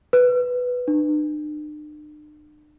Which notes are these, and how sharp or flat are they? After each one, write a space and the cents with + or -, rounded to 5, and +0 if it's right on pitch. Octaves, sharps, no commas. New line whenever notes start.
B4 +5
D4 +45